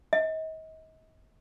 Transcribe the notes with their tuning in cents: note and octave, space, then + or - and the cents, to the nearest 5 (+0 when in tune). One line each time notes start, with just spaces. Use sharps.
D#5 +40